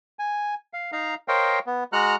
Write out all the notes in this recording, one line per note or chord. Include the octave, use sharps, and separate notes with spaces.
G#5
F5
D#4 F5 A#5
A#4 C5 C#5 D#5 F5 G5
B3
G#3 F#4 F#5 A#5 F6 F#6